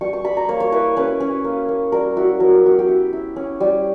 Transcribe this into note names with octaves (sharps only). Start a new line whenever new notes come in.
G3 C#6
C#6
G3 B5
A#5
A#3 C#5
C#5
E4 B4
C#4 B4
C#4
A#3
A#3
G3 A#4
E4 F#4
F#3 A#4
G4
B3 F#4
G4
E4
E4
C#4
G3